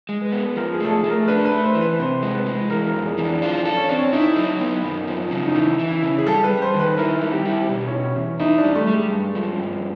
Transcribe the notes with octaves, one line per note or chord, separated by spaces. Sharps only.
G#3
B4
B3
F3 A#4
G#4
A3 A4
G#4
A3
A#4
D4 B4
B4
A3
C5
E3
B4
C3 C5
G#3
B4
G#3
E3 A#4
A#4
F2
G#4
E3
D4
D4 F4
A4
C#4
C4 D4
C#4
D#4 E4
F#3
B3
F#2
F3
C#3
D#4
E3 E4
E3
E4
C#3
G#4
G3 A4
B4
G3
C5
D#3
B4
E4 A#4
G3
G4
E4
G4
B2 G4
C#4
B2
C#4
E2
D#4 E4
D4
G3
A3
G3
G#3
G2
F3
G2